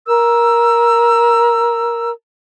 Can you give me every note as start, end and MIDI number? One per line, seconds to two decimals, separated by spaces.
0.08 2.10 70
0.08 2.10 88